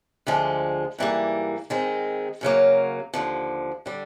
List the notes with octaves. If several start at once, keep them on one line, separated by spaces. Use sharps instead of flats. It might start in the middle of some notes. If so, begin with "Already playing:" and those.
D2 D3 F3 G#3
G#2 E3 G3 A#3
D#3 G#3 C4
F#2 C#3 F#3 A#3
D#2 D3 F3
D3 G3